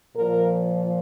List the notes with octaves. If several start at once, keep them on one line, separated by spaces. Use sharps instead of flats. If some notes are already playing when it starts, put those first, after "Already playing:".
A#2 F3 A#4